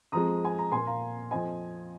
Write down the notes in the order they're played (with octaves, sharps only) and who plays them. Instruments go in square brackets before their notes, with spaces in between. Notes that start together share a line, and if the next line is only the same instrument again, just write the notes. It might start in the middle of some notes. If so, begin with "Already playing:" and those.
[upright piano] F2 F3 G#3 A#5 D#6
G#5
A#5
A#2 A#3 G#5 C6
F5 A#5
F2 F3 C4 D#5 G#5